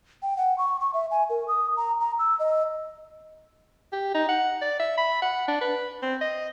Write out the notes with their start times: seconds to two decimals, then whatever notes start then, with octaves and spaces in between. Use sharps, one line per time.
0.22 G5
0.37 F#5
0.58 C#6
0.80 C#6
0.94 E5
1.11 G#5
1.30 A#4
1.48 D#6
1.77 A#5
2.00 A#5
2.19 E6
2.39 D#5
3.93 G4
4.14 D#4
4.29 F#5
4.62 D5
4.79 E5
4.98 B5
5.22 F#5
5.48 D4
5.61 B4
6.03 C4
6.21 D#5